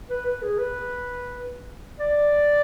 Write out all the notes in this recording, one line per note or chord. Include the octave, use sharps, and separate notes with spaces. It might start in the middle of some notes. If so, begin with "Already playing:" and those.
B4
B4
G#4
B4
D5